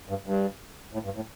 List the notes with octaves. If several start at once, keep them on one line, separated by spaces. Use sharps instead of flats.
G2
G2
A2
G2
A2